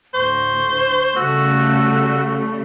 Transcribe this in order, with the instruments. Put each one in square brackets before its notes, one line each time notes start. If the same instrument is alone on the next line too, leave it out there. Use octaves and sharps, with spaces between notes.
[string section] D2 A2 [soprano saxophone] C5 [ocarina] C#6
[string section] C#3 G3 A3 [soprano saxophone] F#4 [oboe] E6